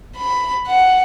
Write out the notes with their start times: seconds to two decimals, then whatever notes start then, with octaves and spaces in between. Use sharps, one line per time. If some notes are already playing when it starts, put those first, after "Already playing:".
0.17 B5
0.67 F#5